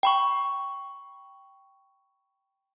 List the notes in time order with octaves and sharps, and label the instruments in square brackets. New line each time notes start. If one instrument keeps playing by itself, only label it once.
[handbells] G5 B5 C#6